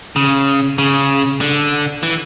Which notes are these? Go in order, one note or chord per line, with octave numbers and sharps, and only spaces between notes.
C#3
C#3
D3
E3